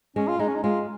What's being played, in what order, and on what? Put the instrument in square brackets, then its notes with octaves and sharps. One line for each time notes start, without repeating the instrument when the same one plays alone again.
[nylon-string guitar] G#3 [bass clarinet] C#4
[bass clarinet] F4
[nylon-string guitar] G#3 [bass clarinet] D#4
[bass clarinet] C#4
D#4
[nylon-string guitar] G#3 [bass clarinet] F4